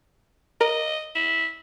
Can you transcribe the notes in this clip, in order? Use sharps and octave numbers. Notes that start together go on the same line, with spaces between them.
A#4 D#5
E4